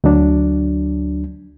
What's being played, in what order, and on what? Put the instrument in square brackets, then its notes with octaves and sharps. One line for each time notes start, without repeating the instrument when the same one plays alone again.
[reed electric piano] D2 F#3 D4